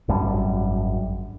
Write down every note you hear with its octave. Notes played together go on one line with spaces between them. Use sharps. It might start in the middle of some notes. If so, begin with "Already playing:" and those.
G#1 F#2 G3 D4